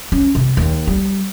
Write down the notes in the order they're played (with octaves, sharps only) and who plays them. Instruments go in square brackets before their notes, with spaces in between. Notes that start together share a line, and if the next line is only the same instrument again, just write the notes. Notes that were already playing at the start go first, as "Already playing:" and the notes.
[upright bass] C#4
C3
D#2
G3